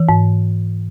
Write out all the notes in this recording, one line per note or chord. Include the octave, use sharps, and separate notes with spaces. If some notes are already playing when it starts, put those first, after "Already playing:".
Already playing: E3
G#2